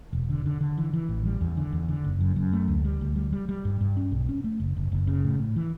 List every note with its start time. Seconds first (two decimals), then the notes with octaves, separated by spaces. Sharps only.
0.13 E1
0.30 D3
0.46 D3
0.61 D3
0.78 E3
0.93 E3
1.09 A1
1.25 G3
1.41 E2
1.57 D3
1.72 E2
1.89 D3
2.04 F#1
2.21 F#2
2.36 F#2
2.53 A3
2.68 D2
2.84 G3
3.01 D2
3.16 G3
3.32 G3
3.49 G3
3.65 G2
3.81 G2
3.97 C#4
4.11 B1
4.29 C#4
4.44 A3
4.60 F#1
4.76 F#1
4.92 F#1
5.07 C#3
5.24 A2
5.39 A2
5.56 E3